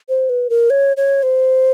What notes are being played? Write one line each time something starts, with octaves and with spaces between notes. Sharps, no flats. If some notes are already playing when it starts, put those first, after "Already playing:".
C5
B4
A#4
C#5
C#5
C5